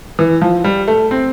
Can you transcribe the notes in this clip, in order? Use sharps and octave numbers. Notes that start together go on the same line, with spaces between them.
E3
F3
G3
A3
C4